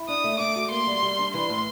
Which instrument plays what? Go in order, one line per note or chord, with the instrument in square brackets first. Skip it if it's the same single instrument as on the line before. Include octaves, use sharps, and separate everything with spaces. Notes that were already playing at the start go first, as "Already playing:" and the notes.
Already playing: [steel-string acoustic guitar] E4
[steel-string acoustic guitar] D4 [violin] D#6
[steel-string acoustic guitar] A3
[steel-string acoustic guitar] A3 [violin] D6
[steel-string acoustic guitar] F#4
[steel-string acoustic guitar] A#3 [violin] C6
[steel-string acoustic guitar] G3
G3
D4
[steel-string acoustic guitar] E3 [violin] C6
[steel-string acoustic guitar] A2